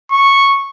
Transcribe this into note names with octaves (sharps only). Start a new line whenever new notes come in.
C#6